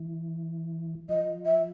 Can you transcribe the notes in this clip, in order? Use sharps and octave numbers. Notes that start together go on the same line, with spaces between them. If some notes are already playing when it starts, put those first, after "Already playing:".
Already playing: E3
F3 D#5
E5